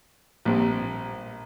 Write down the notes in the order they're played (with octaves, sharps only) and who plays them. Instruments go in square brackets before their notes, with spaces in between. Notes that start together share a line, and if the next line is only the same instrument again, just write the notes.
[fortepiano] A#1 A#2 G3 C4